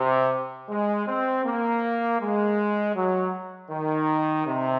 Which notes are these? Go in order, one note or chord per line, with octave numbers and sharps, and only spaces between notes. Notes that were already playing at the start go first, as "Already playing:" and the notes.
Already playing: C3
G#3
C4
A#3
G#3
F#3
D#3
C3